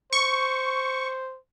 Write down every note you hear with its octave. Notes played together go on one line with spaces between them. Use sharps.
C5 C#6